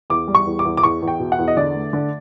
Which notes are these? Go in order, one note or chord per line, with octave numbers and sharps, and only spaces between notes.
E2 D6
G3
C#6
E2
D6
E2
D6
E2 C#6
E2
G5
B2
F#5
E2
D#5
D3 D5
A3
D3